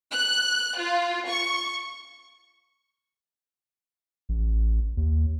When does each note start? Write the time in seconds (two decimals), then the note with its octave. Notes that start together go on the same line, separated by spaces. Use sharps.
0.11 F#6
0.78 F4
1.27 C#6
4.29 A1
4.97 D#2